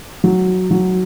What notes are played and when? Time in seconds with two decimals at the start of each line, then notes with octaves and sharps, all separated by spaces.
0.24 F#3
0.71 F#3